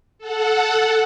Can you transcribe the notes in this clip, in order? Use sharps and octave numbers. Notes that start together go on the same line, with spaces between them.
A4 F#5